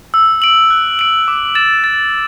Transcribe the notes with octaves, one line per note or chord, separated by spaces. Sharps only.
E6
D7 F#7
F#6
D7 F#7
D6
A6 E7
A6